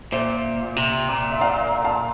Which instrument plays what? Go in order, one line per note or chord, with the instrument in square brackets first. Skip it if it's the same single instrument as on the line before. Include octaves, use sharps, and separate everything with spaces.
[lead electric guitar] A#2 [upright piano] C5 E5
[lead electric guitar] C3
A#2
[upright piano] E5
D5 F5
F5 A5